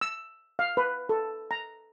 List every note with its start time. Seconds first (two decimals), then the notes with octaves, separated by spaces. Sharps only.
0.01 E6
0.59 F5
0.77 B4
1.09 A4
1.51 A#5